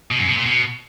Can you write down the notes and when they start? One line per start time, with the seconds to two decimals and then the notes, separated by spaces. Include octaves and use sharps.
0.11 B2
0.20 F#2
0.28 B2
0.37 A#2
0.46 B2